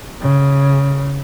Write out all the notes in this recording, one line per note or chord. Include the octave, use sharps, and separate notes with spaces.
C#3